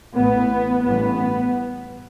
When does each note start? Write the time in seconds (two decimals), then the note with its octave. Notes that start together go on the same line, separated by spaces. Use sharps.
0.14 A1 A2 B3
0.83 A1 G2 B3